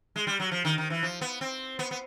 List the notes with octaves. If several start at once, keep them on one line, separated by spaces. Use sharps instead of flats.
G#3
G3
F#3
F3
D#3
D#3
E3
F3
B3
C4
B3
B3